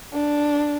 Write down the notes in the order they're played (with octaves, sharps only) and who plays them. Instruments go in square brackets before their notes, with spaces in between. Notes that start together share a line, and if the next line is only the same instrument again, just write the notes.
[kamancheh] D4